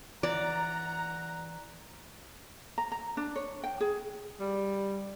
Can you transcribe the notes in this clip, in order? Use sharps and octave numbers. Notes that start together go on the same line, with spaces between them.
E3 D5 F#5 A#5
A#5
A#5
D4
C#5
G5
G#4
G3